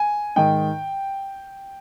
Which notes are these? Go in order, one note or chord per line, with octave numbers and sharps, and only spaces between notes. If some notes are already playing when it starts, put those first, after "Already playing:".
Already playing: G#5
G#2 D#3 G5